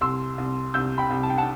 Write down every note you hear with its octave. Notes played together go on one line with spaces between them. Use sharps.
C2 C6 E6
C2
C2 E6 G6
G5 B5
C2
A5
G5
F#5 A5